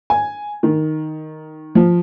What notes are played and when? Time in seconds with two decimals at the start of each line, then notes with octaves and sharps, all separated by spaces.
0.10 G#5
0.63 D#3
1.75 F3